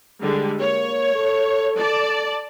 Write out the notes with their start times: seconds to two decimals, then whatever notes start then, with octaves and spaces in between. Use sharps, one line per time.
0.21 D3 G3 G#3
0.61 A#3 C#5
1.15 A4
1.77 D5 A5